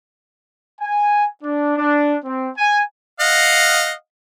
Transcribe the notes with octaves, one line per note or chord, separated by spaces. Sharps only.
G#5
D4
D4
C4
G#5
D#5 F5 F#5